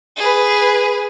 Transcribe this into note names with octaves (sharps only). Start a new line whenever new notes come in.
G#4 B4